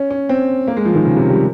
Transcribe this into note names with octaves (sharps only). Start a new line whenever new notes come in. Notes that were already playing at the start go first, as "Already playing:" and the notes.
Already playing: C#4
C#4
C4
A#3
G#3
F3
D#3
C#3
C3
G3